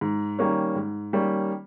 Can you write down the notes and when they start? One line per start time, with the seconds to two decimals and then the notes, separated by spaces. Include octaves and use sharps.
0.01 G#2
0.39 D#3 G3 A#3 C#4
0.75 G#2
1.13 D#3 G3 A#3 C#4